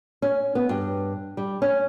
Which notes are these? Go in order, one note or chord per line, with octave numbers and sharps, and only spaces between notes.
C#4
B3
G2
G3
C#4